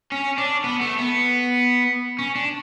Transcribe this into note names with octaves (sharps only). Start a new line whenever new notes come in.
C#4
D4
B3
A3
B3
C#4
D4